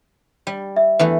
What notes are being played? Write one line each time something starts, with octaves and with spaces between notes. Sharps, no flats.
G3
E5
E2 E3 A3